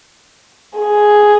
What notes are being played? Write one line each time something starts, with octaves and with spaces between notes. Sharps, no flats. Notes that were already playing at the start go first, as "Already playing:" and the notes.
G#4